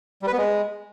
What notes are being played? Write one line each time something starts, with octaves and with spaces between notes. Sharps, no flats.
G3
B4
B3
G#3